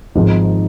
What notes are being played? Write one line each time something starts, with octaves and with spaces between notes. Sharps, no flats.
G#1 G#2 F3 G#3